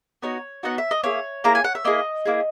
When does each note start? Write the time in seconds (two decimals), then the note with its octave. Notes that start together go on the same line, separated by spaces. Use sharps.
0.22 B3 D#4 F#4 C#5
0.63 B3 D#4 F#4 F#5
0.78 E5
0.91 D#5
1.03 A#3 E4 G#4 C#5
1.44 A#3 E4 G#4 A#5
1.55 G#5
1.64 F#5
1.75 E5
1.85 A#3 E4 G#4 D#5
2.25 A#3 E4 G#4